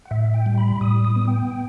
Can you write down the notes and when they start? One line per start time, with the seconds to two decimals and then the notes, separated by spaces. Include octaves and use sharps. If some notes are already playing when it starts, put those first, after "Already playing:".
0.05 F#5
0.11 A2 E5
0.34 G5
0.46 G3
0.58 B5
0.81 A2 D#6
1.05 D#6
1.16 B3
1.28 G5